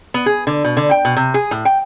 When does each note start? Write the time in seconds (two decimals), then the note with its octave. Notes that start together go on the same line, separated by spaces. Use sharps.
0.14 B3
0.26 G#4
0.47 D3
0.64 B2
0.77 D3
0.91 G5
1.05 B2
1.17 C3
1.34 G#4
1.51 A2
1.65 G5